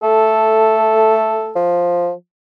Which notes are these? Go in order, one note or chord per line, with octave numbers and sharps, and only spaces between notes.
A3 A4
F3